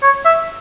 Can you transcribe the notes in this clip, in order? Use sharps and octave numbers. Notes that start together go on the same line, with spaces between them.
C#5
E5